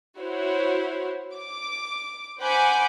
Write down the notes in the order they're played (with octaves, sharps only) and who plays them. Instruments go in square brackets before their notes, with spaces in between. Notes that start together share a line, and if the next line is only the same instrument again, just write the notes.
[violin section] E4 F#4 C5 C#5
D6
C5 F#5 G#5 B5 D6 G6